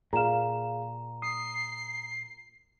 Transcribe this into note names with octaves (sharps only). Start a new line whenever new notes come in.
A#2 G#4 F5 A#5 E7
D#6 C7